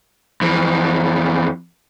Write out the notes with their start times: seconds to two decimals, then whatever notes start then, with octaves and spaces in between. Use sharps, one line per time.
0.41 F2 E3